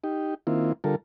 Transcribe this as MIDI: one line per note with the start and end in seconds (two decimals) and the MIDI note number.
0.04 0.34 63
0.04 0.34 67
0.47 0.73 51
0.47 0.73 58
0.47 0.73 60
0.47 0.73 64
0.47 0.73 65
0.84 0.95 50
0.84 0.95 55
0.84 0.95 65
0.84 0.95 69
0.84 0.95 70